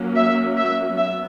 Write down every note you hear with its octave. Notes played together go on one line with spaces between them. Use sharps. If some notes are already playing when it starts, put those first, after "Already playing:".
Already playing: F#3 A#3 C#4
E5
E5
F#3 B3 E5